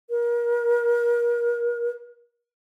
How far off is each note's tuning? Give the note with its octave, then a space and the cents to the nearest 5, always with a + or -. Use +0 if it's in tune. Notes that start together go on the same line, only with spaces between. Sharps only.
A#4 +30